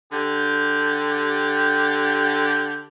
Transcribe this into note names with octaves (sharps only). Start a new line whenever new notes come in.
D3 G4